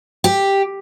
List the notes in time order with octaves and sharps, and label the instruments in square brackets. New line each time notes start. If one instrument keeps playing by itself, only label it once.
[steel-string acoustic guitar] G4